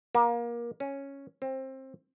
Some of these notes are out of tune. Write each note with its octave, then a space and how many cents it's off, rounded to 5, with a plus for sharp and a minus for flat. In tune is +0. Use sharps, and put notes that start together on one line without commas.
A#3 +25
C#4 -5
C4 +20